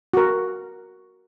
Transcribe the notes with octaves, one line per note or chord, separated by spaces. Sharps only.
F#4 A#4